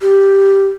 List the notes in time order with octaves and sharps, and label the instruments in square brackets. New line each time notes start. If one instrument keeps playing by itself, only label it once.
[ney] G4